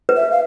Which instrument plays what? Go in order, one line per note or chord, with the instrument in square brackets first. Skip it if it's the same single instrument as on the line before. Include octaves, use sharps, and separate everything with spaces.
[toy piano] B4
[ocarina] E5
F5